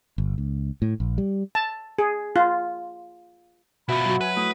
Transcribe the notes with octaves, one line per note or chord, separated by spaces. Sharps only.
G1
C#2
A2
A#1
G3
A5
G#4
F4
B2 F4 F#4 E5 B5
F#3 F#4
B4 G#5
A3 E4 D#6